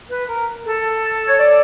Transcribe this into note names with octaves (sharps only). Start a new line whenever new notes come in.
B4
A#4
A4
C#5
D5